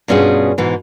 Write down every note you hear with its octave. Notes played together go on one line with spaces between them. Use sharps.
G2 B2 C#4 F4 G#4
G#2 B2 E3